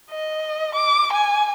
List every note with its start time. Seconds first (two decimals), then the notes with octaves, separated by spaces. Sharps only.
0.10 D#5
0.75 D6
1.13 G#5